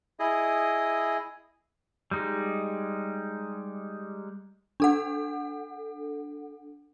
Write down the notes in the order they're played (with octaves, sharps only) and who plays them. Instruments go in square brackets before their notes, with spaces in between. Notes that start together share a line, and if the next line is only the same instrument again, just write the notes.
[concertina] E4 G#4 D#5
[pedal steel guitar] G3 G#3 D#4
[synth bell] D4 A4 F#5